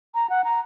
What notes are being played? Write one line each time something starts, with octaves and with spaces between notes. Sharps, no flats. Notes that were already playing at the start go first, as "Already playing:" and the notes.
A#5
F#5
A#5